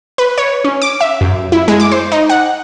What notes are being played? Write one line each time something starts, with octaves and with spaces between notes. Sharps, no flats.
B4
C#5
C#4
D6
E5
F#2
E4
G#3
D6
C5
D#4
F#5